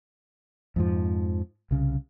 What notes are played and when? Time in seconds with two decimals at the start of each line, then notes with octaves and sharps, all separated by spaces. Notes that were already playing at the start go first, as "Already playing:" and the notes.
0.76 F2 G#2 F3
1.71 C2 C#3